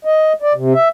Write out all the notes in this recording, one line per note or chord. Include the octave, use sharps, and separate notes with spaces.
D#5
D5
C3
E5